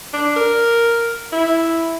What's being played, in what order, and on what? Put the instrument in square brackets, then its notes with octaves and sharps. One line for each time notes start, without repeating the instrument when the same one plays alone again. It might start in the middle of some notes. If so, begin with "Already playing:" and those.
[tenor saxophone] D4
A#4
E4